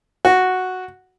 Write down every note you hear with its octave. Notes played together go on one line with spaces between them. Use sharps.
F#4